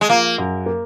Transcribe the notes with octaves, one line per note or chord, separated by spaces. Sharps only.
G#3
F3 A#3
F#2
A#3